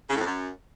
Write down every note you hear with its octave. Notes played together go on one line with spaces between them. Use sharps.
C#3
A2
F2
F#2